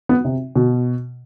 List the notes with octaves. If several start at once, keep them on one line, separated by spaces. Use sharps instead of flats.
B3
C3
B2